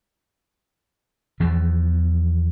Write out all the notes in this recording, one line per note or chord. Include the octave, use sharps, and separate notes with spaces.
E2 E3 F3